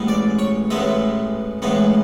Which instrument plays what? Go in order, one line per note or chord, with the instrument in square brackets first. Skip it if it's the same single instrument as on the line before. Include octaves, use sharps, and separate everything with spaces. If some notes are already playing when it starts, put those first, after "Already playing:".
Already playing: [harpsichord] A1 A2 G#3 B3
D5
C#5
A1 A2 G#3 B3 E5
A1 A2 G#3 B3